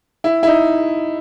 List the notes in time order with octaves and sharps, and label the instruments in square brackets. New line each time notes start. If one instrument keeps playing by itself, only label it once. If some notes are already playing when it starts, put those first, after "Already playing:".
[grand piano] E4
E4
D#4